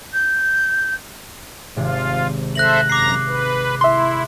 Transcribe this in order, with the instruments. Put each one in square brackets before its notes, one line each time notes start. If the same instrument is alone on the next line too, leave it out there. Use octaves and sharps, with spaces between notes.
[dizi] G6
[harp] G#1 C3 [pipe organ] F4
[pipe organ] A4 C5 E5 [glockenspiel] F#6 A#6 F#7
[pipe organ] F#2 A#5 A#6 [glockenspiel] D6 C7
[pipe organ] B4
[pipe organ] E4 [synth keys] E5 C6